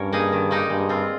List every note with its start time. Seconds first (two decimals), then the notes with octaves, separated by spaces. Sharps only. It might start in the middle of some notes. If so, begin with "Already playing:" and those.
Already playing: G2 C#4 A#4 C#5
0.13 A#3 D#4 G#4
0.32 D#3
0.51 A#3 D#4 G4
0.69 G2 G#3
0.89 C4 F4